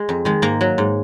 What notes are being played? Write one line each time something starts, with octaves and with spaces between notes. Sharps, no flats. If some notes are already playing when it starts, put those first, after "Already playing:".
Already playing: G#3
F2
D#3 G#3
G#2 A#3
F#3
G#2